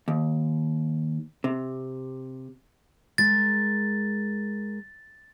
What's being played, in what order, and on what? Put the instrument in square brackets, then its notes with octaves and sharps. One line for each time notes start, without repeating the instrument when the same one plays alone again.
[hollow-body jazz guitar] D#2
C3
[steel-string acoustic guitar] G#3 A#4 [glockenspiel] A6